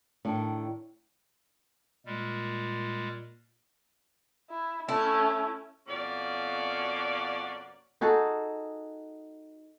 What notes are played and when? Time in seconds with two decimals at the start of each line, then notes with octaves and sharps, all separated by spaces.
0.25 A2 D#3 D4
2.06 A#2 G3 G#3
4.50 E4
4.89 A3 C#4 E4
5.88 F2 B2 A#3 C#4 F#4 D5
8.01 D#4 F#4 G#4 A4